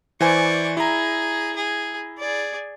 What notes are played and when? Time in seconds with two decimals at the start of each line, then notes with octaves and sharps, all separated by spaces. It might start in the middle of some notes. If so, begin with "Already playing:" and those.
0.21 E3 C5 D5 G#5 C#6
0.77 E4 G#4 A#5
1.56 G#4
2.18 G#4 D5